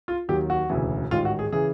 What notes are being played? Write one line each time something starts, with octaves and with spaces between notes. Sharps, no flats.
F4
D#2 D#3 F#3 G4
F#4
E1 D2 C#3 E3
A1 G#2 D#3 F4
F#4
G#4
C#3 E3 G#4